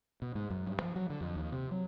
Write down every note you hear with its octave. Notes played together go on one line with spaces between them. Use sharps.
B2
G#2
F#2
G2
F3
F#3
D3
F2
D#2
C3
F#3